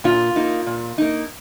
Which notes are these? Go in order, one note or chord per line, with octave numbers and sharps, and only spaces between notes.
A#2 F4
A#3 D#4
A#2
A#3 D#4